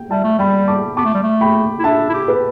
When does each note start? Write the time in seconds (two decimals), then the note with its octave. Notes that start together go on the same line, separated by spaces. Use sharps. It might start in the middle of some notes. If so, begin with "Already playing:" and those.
Already playing: G5
0.10 G3 E5 A5
0.24 A3
0.39 G3 G5 B5
0.68 A5 D6
0.97 B3 A5 D6
1.05 A3
1.14 G3
1.24 A3
1.41 G5 B5
1.79 E4
1.84 D4 E5 A5
2.09 E4
2.14 G4
2.28 B4